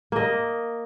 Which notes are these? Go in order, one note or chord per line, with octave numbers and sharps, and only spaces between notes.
A#3 D#5